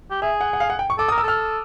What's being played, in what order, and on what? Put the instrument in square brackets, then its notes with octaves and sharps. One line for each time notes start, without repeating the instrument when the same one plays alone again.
[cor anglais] G4
[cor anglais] G#4 [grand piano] E5
[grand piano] F#5
F#5
F5
F#5
G5
C#6
[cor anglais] A4 [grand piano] D6
[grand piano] D#6
[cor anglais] A#4
[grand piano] E6
[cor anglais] A4 [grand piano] F6